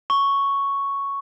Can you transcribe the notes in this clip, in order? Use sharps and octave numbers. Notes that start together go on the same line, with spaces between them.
C#6